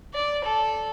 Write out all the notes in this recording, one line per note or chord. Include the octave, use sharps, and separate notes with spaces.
D5
A4